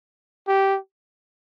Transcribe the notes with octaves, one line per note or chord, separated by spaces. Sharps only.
G4